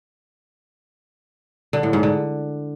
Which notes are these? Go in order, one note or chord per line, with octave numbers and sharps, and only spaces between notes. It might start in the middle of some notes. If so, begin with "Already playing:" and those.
D3
A2
G#2
D3